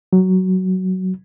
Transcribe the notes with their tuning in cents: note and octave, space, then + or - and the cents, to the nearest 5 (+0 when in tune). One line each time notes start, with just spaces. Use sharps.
F#3 +10